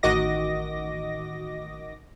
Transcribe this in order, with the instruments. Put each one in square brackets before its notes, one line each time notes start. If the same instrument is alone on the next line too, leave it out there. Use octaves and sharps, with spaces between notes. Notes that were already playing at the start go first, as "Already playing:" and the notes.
[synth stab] A1 D#3 F#4 D#5 D6 A#6